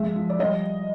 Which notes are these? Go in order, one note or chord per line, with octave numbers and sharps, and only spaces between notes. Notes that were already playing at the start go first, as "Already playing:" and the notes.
Already playing: F3 G#3 E5
F3
D5
G3 D#5